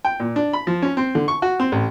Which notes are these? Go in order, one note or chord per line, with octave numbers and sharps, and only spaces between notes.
G5
A#2
D4
B5
F3
C#4
C4
D3
C#6
F#4
C4
A1